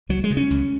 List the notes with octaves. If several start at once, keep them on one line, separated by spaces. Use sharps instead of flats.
C#2 F#3
G#3
C#3
C#4
C#2